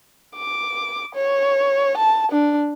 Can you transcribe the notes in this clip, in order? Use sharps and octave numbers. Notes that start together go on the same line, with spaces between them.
D6
C#5
A5
D4